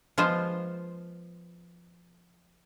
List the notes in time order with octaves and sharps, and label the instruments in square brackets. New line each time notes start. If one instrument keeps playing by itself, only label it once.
[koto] F3 G#3 B3 F4 C5